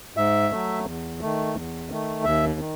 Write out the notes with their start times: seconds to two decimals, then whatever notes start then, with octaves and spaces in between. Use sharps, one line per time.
0.17 G#2 E5
0.51 F#3 A3
0.85 E2
1.21 D#3 A3
1.55 E2
1.90 D#3 A3
2.24 D#2 E5
2.59 D#3